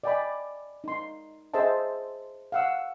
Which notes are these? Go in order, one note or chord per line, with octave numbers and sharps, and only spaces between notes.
D5 D#5 G5 G#5 B5 D6
D#4 C6
G#4 C5 D#5 E5 A5
F5 F#5 E6